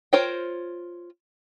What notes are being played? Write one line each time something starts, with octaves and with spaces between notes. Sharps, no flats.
F4 A#4 C5 C#5 G5